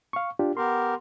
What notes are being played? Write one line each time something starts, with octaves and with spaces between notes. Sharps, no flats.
F5 C#6
D4 F4 G4
B3 G4 A#4 C6